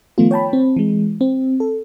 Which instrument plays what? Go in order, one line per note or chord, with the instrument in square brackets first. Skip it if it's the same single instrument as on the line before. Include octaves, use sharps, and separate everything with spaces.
[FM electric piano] D#3 F3 A3 B3 F4
C#5 G5 A5 B5
C4
E3 G#3
C4
A4